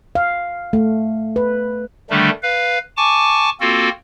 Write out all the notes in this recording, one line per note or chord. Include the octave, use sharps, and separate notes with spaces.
F5
A3
B4
D3 D#3 G3 A3 D4
B4 F5
G#5 A5 C#6 D6
A#3 C4 F4 F#4 A4